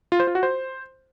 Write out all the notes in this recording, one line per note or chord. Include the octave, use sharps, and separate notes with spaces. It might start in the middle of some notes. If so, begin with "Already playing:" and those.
F4
C5
F4
F#4
C5